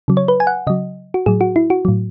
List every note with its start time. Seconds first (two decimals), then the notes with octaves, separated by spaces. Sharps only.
0.08 C#3 F#3
0.17 C#5
0.28 B4
0.40 G#5
0.47 F#5
0.67 C#3 F#3 D#5
1.14 F#4
1.26 A2 F#3 G#4
1.41 F#4
1.56 E4
1.70 F#4
1.85 A2 F#3